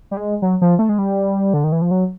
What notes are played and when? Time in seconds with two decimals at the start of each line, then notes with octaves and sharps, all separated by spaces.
0.11 G3
0.17 G#3
0.42 F#3
0.62 F3
0.79 A3
0.89 G#3
0.99 G3
1.54 D3
1.64 D#3
1.72 E3
1.82 F3
1.91 F#3